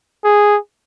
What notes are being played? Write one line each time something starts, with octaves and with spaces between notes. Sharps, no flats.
G#4